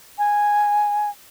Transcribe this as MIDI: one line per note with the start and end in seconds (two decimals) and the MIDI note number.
0.19 1.10 80